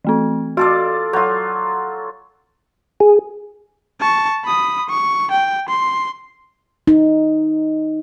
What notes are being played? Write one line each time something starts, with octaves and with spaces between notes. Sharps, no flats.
E3 A3 C4
F4 F#4 A4 D5
F#3 F4 A4
G#4
A5 C#6
B5 D#6
C#6
G5
C6
D#4